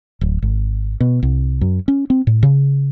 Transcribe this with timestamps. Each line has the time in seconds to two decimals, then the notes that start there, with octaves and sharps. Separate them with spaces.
0.21 D1
0.42 G#1
1.00 B2
1.23 C2
1.61 F#2
1.88 C#4
2.10 C4
2.27 A2
2.43 C#3